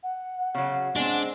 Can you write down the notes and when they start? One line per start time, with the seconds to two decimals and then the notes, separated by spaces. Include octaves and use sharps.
0.03 F#5
0.55 C#3 F#3
0.96 G#3 C4 D4